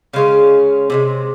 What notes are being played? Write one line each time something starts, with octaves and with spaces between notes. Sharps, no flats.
C#3 G#3 C#4 F5
C3 F3 G#3